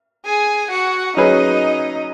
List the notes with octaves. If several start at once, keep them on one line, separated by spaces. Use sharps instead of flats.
G#4 G#5
F#4 F#5
F#3 C#4 D#4 G#4 B4 D#5